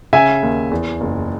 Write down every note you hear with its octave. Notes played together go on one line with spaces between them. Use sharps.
C#3 E5 G#5
D#2
E2
F#1